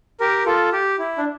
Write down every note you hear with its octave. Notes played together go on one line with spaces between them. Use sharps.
G4 A#4
F4 A4
G4
E4
D4